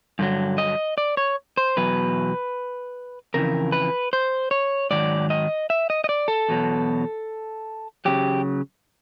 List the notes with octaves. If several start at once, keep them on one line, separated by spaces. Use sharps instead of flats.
G2 D3 F#3
D#5
D5
C#5
C5
E2 B2 F#3 B4
F2 C#3 E3 A#4
B4
C5
C#5
G#2 D#3 F#3 D5
D#5
E5
D#5
D#5
D5
A4
E2 B2 F#3
C#3 F#3 G4